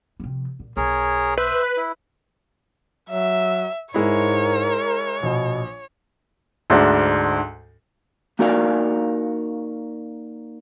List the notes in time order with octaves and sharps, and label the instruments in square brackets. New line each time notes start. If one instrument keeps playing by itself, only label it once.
[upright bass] C3 F3
A#2
[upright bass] B1 [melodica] G#4 A#4 C#5
[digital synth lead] B4 [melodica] C5 E5
[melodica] E4
[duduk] F#3 [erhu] E5
[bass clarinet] G#2 [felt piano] G#3 E4 [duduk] A#4 [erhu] C#5
[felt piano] A#1 [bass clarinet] B2
[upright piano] D2 G#2 D4
[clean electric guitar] A#3 D#4 F#4 A#4 D5 F5